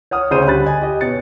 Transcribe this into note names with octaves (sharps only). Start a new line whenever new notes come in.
C#5 F#5 D#6 F6
D2 C#3 C5 C#5 D#7
D3 G3 B5 F#6 A6
D#5 G#5
G4 D#5
B2 C#5 A6 C#7